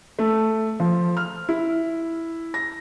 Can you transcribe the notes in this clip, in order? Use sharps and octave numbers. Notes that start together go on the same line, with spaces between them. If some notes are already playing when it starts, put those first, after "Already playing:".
A3
F3
F6
E4
A#6